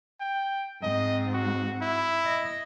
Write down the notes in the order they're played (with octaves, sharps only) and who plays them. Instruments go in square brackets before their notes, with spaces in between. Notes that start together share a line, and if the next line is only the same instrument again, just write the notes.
[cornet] G5
[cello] G#2 C4 [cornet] D#5
[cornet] F#4
E4
[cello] D#5